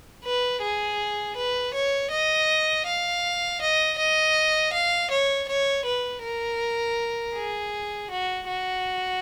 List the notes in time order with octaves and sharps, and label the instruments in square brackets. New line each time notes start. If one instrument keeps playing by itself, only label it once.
[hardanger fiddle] B4
G#4
B4
C#5
D#5
F5
D#5
D#5
F5
C#5
C#5
B4
A#4
G#4
F#4
F#4